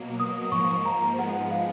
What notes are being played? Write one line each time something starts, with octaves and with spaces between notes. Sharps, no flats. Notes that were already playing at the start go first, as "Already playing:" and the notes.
Already playing: B2 F#3 A#3
D#6
G#2 F3 A#3 C#6
A#5
G#2 F3 G#3 B3 F#5
F5